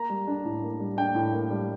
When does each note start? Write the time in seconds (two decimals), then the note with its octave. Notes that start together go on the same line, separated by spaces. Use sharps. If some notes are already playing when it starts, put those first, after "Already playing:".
Already playing: A#3 A#5
0.10 G3
0.27 D4
0.45 A2
0.63 A#3
0.80 G3
0.97 D4 G5
1.15 A2
1.33 A#3
1.51 G3